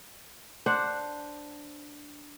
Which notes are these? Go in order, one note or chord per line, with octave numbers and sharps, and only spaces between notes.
D4 C5 F#5